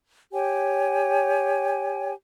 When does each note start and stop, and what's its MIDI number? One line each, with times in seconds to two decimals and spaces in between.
0.33 2.12 67
0.33 2.12 73
0.33 2.12 79
0.33 2.12 80